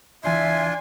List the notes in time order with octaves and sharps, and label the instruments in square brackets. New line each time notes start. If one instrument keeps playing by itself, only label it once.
[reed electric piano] C#2 E3 [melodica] D4 F4 C6 [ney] E5 [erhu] G#5